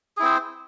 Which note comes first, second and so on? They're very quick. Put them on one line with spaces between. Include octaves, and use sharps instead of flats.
G#4 E4 C4 C5